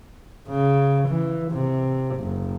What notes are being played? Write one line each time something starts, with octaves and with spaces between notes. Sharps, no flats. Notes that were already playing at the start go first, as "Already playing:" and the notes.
C#3
E3
C3
F#1